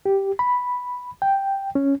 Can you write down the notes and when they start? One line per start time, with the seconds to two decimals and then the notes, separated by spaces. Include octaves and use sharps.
0.06 G4
0.39 B5
1.22 G5
1.75 C#4